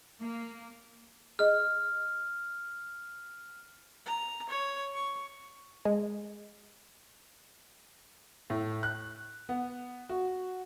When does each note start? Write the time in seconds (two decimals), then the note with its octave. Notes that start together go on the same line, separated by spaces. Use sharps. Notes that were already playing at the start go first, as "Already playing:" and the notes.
0.20 A#3
1.39 G#4 D#5 F6
4.05 A#5
4.49 C#5
4.95 C#6
5.85 G#3
8.50 A2
8.83 F#6
9.49 B3
10.09 F#4